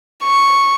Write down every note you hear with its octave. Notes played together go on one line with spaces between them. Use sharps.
C#6